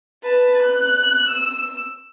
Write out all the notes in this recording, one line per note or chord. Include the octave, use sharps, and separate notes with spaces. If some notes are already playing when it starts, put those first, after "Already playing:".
B4 A5
F#6
E6